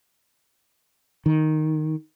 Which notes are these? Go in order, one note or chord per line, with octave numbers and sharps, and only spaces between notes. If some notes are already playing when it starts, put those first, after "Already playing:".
D#3